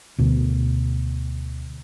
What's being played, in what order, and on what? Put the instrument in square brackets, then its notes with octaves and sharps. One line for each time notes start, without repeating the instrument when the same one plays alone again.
[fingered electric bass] D2 B2